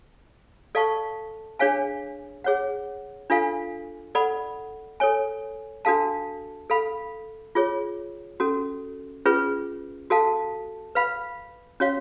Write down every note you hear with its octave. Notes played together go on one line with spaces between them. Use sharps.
A4 D5 F5 A5 C#6
D4 G#4 C#5 F5 G#5
G#4 C#5 F#5
D4 F4 A4 F5 G#5
A4 D5 F#5 B5
A4 C#5 G#5
D4 F#4 A4 F5 A5
A4 F5 B5
F4 G#4 C#5
C#4 F#4 A4
C#4 F4 G#4 B4
F#4 A4 F5 A5
B4 F5 B5
C#4 F#4 C#5 F5